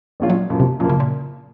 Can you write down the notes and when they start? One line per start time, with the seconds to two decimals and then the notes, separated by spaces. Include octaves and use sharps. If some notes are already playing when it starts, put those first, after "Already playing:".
0.20 A#1 A#2 G#3 C#4 F4
0.30 F#3
0.50 F#2 A#2 F3 A#3
0.60 C3
0.80 F#2 A#2 F3 A#3
0.90 C#3
1.00 A#2